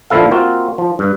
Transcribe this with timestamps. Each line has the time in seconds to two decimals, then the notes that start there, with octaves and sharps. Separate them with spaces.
0.10 A#2 D3 F3 E4 A4 F5
0.31 A#3 C4 F4 F#4
0.78 F3
0.99 G2